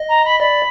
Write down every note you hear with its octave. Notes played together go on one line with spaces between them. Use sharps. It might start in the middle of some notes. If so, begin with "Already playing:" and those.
Already playing: D#5
A#5
B5
D5 B5